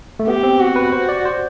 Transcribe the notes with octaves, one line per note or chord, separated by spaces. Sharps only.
A3
B3 G4
C4
F#4
B4
C5
D5
C5